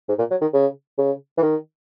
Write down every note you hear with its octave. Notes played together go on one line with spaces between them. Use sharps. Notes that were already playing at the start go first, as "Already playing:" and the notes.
G#2
A#2
F#3
D#3
C#3
C#3
E3
D#3